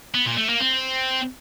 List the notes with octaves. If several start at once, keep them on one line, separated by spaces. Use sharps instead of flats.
B3
A#2
A3
A#3
C4